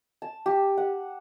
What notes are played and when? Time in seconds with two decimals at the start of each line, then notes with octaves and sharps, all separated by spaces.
0.22 A5
0.46 G4
0.77 F#5